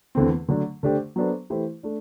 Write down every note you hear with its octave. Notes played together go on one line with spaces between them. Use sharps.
E2 D3 A3 C4
D3 F#3 A3 D4
D3 A3 D4 G4 C5
F#3 B3 D4 A4 C5
E3 A3 E4 G4 C5
A3 D4